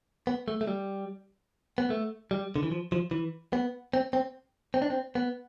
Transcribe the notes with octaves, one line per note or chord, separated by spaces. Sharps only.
B3
A3
A3
G3
B3
A3
G3
D3
E3
F3
F3
E3
B3
C4
C4
C4
D4
C4
B3